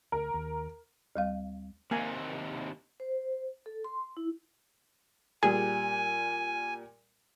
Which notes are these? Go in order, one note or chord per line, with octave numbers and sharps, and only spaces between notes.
D2 A#4
D#2
D2 G3 F5
D#2 C3 A#3 G#5
C5
A4
C6
E4
A#2 G3 G#4 G#5